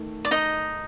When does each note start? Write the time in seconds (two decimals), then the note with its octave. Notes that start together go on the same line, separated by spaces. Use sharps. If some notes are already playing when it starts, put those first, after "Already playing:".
Already playing: D#3 A3
0.25 D5
0.31 D#4 D#5